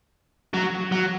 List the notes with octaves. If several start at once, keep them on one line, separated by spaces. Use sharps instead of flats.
F#3
F#3